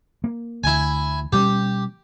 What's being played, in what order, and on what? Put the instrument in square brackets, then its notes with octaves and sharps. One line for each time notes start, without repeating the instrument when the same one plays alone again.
[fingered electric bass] A#3
[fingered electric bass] D2 [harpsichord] E4 G#5
[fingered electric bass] B2 G3 C#4 [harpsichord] G4